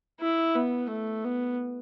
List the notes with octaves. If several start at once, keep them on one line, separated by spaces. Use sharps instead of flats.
E4
B3
A3
B3